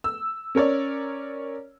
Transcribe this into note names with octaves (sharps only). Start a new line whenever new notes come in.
E6
C#4 A#4 C#5 D5